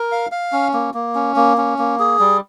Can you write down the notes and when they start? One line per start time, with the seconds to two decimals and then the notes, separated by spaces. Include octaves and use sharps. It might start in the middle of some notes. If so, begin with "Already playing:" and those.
Already playing: A#4
0.12 F5
0.32 F5
0.52 C#4
0.73 A#3
0.94 A#3
1.15 C#4
1.36 A#3
1.58 C#4
1.79 A#3
1.99 G#4
2.19 G3